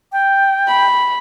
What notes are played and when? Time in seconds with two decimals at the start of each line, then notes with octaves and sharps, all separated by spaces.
0.12 G5
0.67 B5